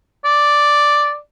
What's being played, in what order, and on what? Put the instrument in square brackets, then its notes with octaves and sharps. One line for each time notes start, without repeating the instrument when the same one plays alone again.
[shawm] D5